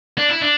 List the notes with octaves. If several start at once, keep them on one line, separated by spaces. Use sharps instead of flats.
D4
E4
D4